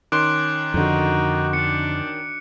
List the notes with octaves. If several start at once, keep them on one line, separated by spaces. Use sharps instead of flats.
D#3 C#4 C6 D6 F#6 D7
F2 D3 D#4 F#4
D4 C#7